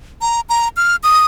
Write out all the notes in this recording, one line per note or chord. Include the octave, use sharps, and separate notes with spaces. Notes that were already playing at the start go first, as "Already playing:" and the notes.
A#5
A#5
F6
D#6